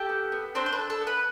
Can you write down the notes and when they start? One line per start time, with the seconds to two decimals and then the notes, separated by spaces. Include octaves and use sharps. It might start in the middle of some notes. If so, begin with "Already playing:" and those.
Already playing: G4 A4 G5
0.09 B3
0.32 B3
0.55 C4 D4 C5
0.66 C5
0.73 B4
0.79 A4
0.90 A4
1.01 B3
1.07 B4